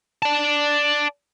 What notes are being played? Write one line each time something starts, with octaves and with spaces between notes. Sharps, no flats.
D5 A5